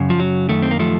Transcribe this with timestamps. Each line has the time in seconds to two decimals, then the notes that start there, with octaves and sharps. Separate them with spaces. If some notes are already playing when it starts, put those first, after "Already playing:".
Already playing: F#2 C#3
0.10 F3
0.20 F#3
0.49 F#2 D#3 A3
0.63 C4
0.71 A#3
0.79 F3 A3